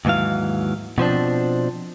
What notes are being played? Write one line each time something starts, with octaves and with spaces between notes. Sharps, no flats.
D#2 G#2 E3 F#3 F5
B2 F3 C4 D4